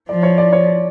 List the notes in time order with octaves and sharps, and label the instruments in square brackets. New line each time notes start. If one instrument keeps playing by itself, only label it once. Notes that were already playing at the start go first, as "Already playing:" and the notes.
[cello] F3 [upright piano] D5
[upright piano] C#5
D5
C#5